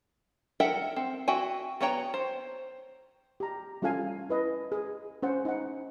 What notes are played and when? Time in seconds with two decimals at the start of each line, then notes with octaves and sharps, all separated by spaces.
0.60 A4 A#4 E5 F#5 G5
0.96 C4
1.28 F#4 E5 G5 G#5
1.81 B3 F#4 C#5 G5 A#5
2.14 C5
3.40 G4 A#5
3.82 G3 C#4 F4 A4 F5 G#5
4.29 E4 B4 D#5
4.72 G#4
5.23 C#4 C5 F#5
5.45 D#4 F#5